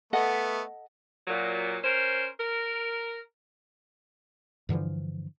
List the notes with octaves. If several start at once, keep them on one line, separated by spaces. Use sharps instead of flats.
A3 B3 A4 D#5 F#5
A#2 F#3
C#4 A#4 C5
A#4
G2 D3 E3 F3